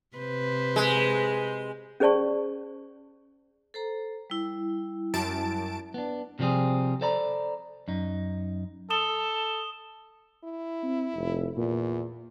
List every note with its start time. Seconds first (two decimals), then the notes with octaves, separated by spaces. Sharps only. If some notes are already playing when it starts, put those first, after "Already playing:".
0.17 C3 B4 C5
0.76 G#3
2.00 C#4 G#4 C5 D5 A5 C#6
3.74 A4 C5 A#5
4.30 G3 E4
5.14 F#2 A5 D7
5.94 B3 D4
6.39 C3 F3 G3 C4 G#4
7.01 A4 C5 D5 A#5 B5
7.88 F#2 D#4
8.90 A4 D#6 E7 G7
10.44 E4
10.83 C4
11.15 F1
11.57 E2 A#2